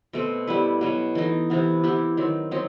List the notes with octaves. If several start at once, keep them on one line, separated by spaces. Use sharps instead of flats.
B2 A3 C4
G3 B3 E4 B4
B2 F#3 B3
E3 A3 D#4
C3 E3 B3
E3 B3 E4 G4
D#3 F#3 C4
F#3 C4 D#4